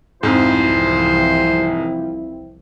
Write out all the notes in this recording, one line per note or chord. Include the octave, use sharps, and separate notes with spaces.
C2 F2 G#2 E3 F3 C4 E4 C5